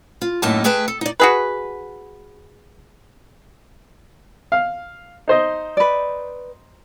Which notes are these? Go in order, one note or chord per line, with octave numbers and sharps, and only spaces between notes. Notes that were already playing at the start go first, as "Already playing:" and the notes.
F4
F#2 A2 A3 A#3 D#4 A5
A3 G#4 B4 G5 A5
A4
D#4 D5
F#4 G#4 B4
F5
D#4 C5 D#5
B4 D5